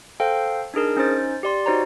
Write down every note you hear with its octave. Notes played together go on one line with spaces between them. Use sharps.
A4 C5 F5 G5
D4 D#4 G#4 A#4
C#4 D#4 C5 A6
G4 D5 C6
D#4 F#4 C5 C#5 A#5